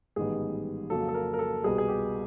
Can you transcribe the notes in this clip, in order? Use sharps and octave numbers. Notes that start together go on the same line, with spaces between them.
A1 G#2 D#3 G3 B3 G#4
F2 C#3 F#3 A#3 A4
A4
A#4
A#4
A4
C2 B2 G3 B3 G#4
G#4
G4